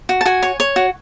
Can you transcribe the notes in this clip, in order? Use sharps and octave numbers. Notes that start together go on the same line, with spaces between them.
F#4
A5
F#4 G#5
C#5
C#5
F#4